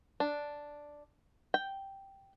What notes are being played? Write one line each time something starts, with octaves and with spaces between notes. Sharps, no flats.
D4
G5